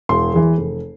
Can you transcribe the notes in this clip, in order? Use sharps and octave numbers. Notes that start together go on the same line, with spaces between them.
E1 C6
E2 E3
F1